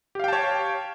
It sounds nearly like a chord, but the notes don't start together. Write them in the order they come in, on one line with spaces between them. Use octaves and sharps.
G4 F5 G5 A5 C#5